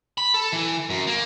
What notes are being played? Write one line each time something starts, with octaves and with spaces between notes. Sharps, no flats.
B5
A4
E3
F#2
A#3